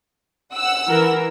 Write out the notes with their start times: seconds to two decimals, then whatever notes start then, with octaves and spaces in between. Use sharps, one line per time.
0.55 F#5 E6
0.87 E3 A#4